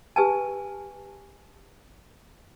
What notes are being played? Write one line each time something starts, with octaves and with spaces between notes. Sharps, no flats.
G4 B4 G#5 A5